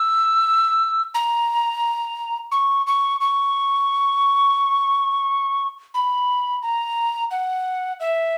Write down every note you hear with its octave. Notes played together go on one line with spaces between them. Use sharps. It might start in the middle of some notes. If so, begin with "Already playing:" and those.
Already playing: E6
A#5
C#6
C#6
C#6
B5
A#5
F#5
E5